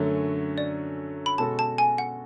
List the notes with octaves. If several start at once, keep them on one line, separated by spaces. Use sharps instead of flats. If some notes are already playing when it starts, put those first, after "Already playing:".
Already playing: F#2 D3 F#3 A3 C#4
D5
B5
B2 G#3 C#4 F#4 A4 A5
A5
G#5
F#5